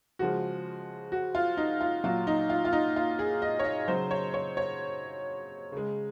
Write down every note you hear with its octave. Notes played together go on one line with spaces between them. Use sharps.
C#3 F3 G#3 F#4
F#4
F4
D#4
F4
A#2 F#3 F4
D#4
F4
F4
D#4
F4
G#4
D#5
C#5
D#5
C#3 F#3 C5
C#5
C#5
C#5
C#3 G#3